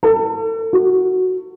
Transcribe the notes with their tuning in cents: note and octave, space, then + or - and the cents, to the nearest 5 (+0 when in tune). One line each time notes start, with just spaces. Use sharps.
A4 +35
F#4 +0